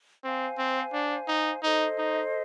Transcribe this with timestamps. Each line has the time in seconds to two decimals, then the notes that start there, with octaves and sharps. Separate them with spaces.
0.24 C4 C5 F5 G#5
0.58 C4
0.93 D4
1.28 D#4
1.63 D#4 A4 C5 D#5
1.98 D#4